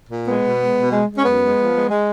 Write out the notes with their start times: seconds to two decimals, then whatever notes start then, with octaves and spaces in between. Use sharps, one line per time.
0.09 A#2
0.25 G#3 B3
0.42 B2
0.59 G#3
0.75 B2
0.91 G#3
1.08 G#3
1.17 C#4
1.24 F#2 B3
1.40 G#3
1.57 F3
1.74 G#3
1.90 G#3